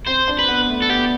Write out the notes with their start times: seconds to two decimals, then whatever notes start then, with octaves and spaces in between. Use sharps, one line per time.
0.07 C4 C5
0.28 D4
0.39 B4
0.48 B3
0.69 A3
0.82 A4
0.89 B3 G4